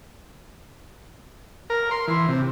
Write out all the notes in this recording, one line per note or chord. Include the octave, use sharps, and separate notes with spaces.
A#4
C6
E3
C3